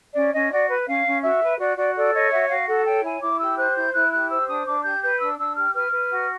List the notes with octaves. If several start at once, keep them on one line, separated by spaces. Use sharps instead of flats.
C#4 D5
C#4 D#5
F#4 D5
B4
C#4 F5
C#4
F#4 E5
B4
F#4 D5
F#4 D5
A4 D5
C#5 D#5
F#4 E5
F#4 F5
A4 F#5
C#5 G5
E4 G#5
E4 D6
G4 E6
C5 F#6
E4 G6
E4 F#6
G4 F#6
C5 E6
D4 D#6
D4 D6
G4 G6
B4 G6
D4 E6
D4 E6
G4 F6
B4 F6
B4
F#4